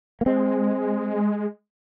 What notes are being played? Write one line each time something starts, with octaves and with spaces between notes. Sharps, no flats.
A#3
G#3 C4